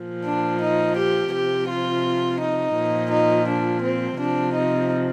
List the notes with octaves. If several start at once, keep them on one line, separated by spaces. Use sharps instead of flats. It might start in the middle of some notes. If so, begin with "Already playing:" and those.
Already playing: A#2 F3
D4
D#4
G4
C3 F3 G4
F4
D#4
A#2 F3
D#4
D4
C4
C3 F3 D4
D#4